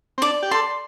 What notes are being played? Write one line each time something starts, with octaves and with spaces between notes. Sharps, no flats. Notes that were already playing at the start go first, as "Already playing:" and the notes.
C4
D4 D5
G4
A4 C6